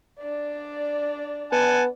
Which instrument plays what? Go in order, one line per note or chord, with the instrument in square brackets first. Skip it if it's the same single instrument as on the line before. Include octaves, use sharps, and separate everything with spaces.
[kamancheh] D4 D5
[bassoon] B3 [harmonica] F#5 G#5 A5